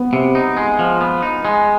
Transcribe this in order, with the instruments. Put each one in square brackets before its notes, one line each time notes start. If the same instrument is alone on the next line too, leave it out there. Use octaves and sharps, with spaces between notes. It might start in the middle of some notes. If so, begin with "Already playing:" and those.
Already playing: [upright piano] B3
[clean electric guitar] C3
D#4
G#3
F3
B3
D#4
G#3